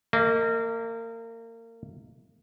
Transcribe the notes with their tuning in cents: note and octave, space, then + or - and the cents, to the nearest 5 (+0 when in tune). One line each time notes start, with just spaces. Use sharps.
A#3 -30 D#5 +25